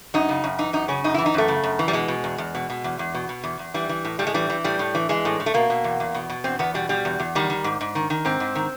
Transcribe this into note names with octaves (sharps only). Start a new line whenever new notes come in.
F#2 D#4
C#3
F#2
E3 D#4
F#2 D#4
C#3 C#4
F#2 D#4
E4
E3
D#4
F#2 A3
C#3
F#2
E3
G3
B2 G#3
B2
E2
E2
B2
B2
E2
E2
B2
B2
E2
E2
E3 G3
E3
A2
A2 G3
G#3
E3 G3
E3
A2 G3
A2
E3
E3 G#3
A2
A2
A3
B2 A#3
B2
E2
E2
B2
B2
E2 C4
E2 B3
B2 G3
B2 G3
E2
E2
D#3 G3
D#3
G#2
G#2
D#3
D#3
G#2 C4
G#2
D#3